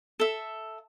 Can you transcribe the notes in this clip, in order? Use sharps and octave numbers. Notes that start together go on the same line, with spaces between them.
A4 E5